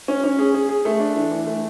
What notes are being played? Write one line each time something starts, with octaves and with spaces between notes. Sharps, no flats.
C#4
C#4
G#4
G#4
G#4
A3
D4
E3
E3
A3